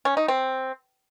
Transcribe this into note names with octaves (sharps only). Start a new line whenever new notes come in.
C#4
D#4
C4